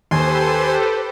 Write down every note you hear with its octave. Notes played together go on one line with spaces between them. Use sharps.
D#2 G4 A4 B4 C5 G#5 C6